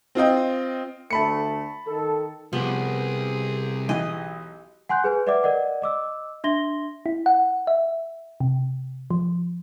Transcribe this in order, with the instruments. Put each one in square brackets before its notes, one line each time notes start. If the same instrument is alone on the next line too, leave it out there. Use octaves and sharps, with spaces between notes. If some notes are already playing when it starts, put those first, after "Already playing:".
[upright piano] C4 F4 D#5 G5
[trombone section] D2 A3 [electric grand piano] A5 B5 C#7
[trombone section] D#3 A4
[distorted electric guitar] C2 [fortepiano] F3 [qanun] B3 [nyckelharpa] G4 G#4
[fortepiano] B1 E3 [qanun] D#5
[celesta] F#5 G#5 C6 F#6 G6
G#4 B4 G#5
B4 D5 E5 F#5 D6
A#4 D5 D#5 F#5
D#5 D6 E6
D4 E5 C6 A#6 G7
[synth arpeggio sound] E4
F#5
E5
C3
F3